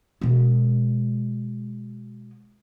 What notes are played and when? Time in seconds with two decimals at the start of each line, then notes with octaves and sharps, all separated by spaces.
0.21 B2 G#3